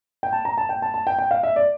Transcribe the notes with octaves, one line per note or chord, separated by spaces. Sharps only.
G5
A5
A#5
A5
G5
A5
A5
G5
G5
F5
E5
D5